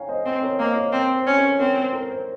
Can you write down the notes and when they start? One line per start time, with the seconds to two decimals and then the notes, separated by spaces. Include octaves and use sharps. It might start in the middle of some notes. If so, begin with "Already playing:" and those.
Already playing: C#5 F5 G5 G#5 A#5
0.08 C5 D#5
0.25 C4 C5
0.42 A#4 C#5
0.59 A#3 C5 D#5
0.75 A#4 C#5
0.92 C4 C5
1.15 C5
1.27 C#4
1.37 A#4 C#5
1.59 C4 A#4 C#5
1.77 C5
1.93 A#4
2.10 C5